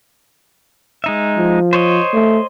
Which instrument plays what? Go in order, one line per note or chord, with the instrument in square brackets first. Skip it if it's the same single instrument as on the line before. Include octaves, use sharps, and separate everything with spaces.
[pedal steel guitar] G#3 D#4 E5
[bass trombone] F3
[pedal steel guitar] C5 C#5 D#5
[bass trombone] A3